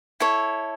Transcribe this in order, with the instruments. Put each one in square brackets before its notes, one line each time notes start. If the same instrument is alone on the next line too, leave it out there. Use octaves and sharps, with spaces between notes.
[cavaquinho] E4 A4 C#5